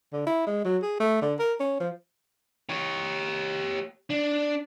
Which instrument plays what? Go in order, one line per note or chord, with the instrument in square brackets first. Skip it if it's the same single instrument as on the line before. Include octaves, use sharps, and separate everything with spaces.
[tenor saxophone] D3
E4
G#3
F#3
G#4
A3
D3
A#4
C#4
F3
[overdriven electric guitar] G4 C#5
D4